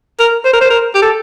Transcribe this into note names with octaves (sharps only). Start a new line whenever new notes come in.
A#4
C5
A#4
C5
A#4
G4
A4